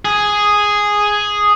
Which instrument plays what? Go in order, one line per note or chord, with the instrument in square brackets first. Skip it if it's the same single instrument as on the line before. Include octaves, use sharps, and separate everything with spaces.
[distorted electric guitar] G#4